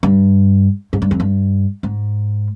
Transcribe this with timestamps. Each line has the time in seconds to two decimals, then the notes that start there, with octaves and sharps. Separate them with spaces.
0.03 G2
0.93 G#2
1.02 G2
1.11 F2
1.20 G2
1.83 G#2